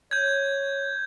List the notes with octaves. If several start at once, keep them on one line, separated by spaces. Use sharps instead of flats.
C#5 G6 G#6